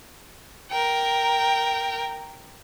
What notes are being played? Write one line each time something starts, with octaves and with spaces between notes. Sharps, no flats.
A#4 G5